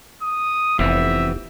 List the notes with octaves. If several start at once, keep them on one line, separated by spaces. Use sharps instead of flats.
D#6
F1 E3 B3 C4 E5